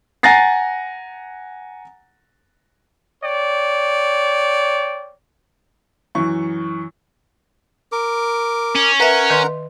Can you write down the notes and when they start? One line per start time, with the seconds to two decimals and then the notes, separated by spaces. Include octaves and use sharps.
0.23 F#5 G#5 A#5 A6 A#6 C7
3.24 C#5 D5 G5
6.15 F#2 E3 C#6
7.92 A#4 D6
8.76 C#4
9.00 A#4 B4 E5 F#5 A#5
9.30 D#3 B4 C6